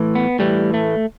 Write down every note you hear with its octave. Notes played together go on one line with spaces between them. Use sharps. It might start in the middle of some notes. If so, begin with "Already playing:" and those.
Already playing: A2 E3
B3
A2 E3 G3
A3